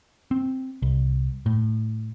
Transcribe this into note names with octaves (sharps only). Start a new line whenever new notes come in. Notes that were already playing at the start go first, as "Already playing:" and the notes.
C4
C2
A2